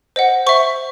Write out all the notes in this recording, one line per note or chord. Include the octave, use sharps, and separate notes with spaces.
C5 D#5 F#5
C5 E5 C#6